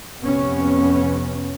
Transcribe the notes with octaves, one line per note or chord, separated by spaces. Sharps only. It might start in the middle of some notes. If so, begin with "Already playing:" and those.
F2 C3 B3 C#4